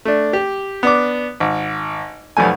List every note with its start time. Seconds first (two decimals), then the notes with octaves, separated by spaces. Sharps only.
0.05 A3 D4
0.33 G4
0.83 B3 D4 D6
1.40 G#1
2.37 B1 F2 G3 A3 G#5